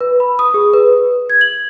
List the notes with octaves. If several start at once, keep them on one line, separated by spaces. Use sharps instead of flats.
B4
B5
D#6
G#4
B4
G#6
F#7